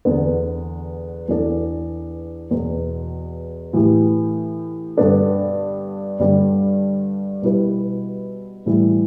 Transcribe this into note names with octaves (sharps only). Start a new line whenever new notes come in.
E2 D3 B3
E2 E3 B3 D4 A4
E2 B2 B3
A2 E3 A3 E4 G4
G2 D3 B3 D4 A4
G2 D3 G3 D4
B2 G3 E4 G4 B4
A2 E3 G3 E4